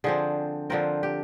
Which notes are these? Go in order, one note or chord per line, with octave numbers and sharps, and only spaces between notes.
D3 F3 C4 G#4
D3 F3 C4 A#4
G4